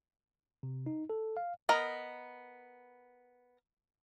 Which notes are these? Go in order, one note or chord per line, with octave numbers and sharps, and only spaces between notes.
C3
D#4
A4
F5
B3 A#4 D#5 A#5